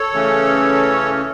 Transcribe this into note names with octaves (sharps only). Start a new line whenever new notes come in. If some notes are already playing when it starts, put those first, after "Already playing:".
Already playing: A4 C#5
C#3 E3 A3 C#4